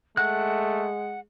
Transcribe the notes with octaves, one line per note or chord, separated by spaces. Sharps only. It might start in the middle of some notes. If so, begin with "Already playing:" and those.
G#3 A3 F#5 F#6